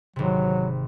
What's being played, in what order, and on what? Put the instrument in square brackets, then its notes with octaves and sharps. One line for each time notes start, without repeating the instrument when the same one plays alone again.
[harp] G#1 C3 [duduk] F#3